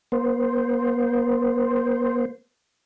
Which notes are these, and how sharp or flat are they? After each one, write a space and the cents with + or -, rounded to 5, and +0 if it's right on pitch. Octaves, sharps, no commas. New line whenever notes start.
A#3 +45 C5 +0